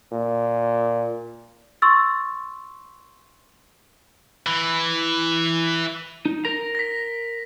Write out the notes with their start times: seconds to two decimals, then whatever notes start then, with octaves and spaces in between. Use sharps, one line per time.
0.12 A#2
1.82 C6 C#6 E6 A6
4.46 E3
6.25 D#4
6.45 A#4 A#5 A#6
6.75 A#6 B6